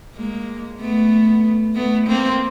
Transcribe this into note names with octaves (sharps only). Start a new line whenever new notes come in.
G#3 A#3
A3 B3
A3 B3
A#3 C4